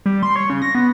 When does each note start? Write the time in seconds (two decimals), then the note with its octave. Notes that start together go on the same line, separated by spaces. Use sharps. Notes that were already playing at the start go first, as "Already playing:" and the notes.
0.06 G3
0.23 C6
0.36 C#5
0.50 C#3
0.62 A#6
0.75 B3